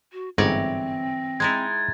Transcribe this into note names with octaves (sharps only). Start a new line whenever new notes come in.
F#4
G1 G#2 E3 C4 C#5 D5 G#5 A#6
G#3 D#4 E4 G#6 A6